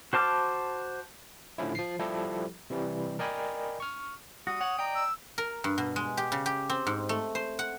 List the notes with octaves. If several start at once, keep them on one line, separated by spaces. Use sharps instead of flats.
F#4 C5 A5 D6 F6
A2 D3 F3 C#4 E4
F3 C7
F3 G3 E4 G4 A4
C3 E3 G3
A#4 D5 D#5 G5 G#5 B5
C#6 F6
G3 F#4 D#6
C#5 F#5
D5 D#5 G5 A#5
E6
A#4
G2
B2
G#3
G4
C#3
G4
C4
G#2
A3
C5
F#5